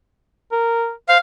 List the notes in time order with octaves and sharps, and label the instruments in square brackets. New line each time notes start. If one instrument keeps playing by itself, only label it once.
[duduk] A#4
[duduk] C5 [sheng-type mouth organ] F5